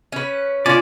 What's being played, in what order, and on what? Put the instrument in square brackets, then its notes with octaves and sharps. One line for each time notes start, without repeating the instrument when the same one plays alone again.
[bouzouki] C#4 B4
[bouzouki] C#4 D4 [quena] F4 [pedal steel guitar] D5